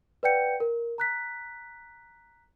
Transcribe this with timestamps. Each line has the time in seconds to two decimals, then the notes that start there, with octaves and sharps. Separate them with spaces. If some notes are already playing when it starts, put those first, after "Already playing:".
0.23 B4 D5 F#5 G5 G6 C#7
0.60 A#4
0.98 A#5 F#6 B6